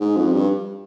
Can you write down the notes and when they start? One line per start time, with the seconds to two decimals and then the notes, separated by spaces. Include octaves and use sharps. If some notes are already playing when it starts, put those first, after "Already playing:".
0.01 G#2
0.16 F2
0.33 G2